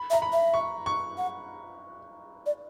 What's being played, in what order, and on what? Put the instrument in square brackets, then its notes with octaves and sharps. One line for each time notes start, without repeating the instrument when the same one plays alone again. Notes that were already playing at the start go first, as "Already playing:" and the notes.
Already playing: [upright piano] B5
[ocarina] E5
[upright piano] A#5
B5
[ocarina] E5
[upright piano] C#6
C#6
[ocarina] F#5
D5